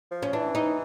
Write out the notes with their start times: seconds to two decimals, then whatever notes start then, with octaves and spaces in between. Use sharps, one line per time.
0.11 F3
0.22 C#4
0.33 E3 D4
0.55 D#4